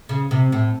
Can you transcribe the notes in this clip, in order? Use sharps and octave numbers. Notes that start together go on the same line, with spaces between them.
C#3
C3
A2